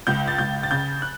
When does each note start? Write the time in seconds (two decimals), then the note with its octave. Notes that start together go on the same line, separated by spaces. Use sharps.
0.07 C#2 G6
0.28 A6
0.38 C#2 G6
0.63 A6
0.71 C#3 G6
1.02 F#6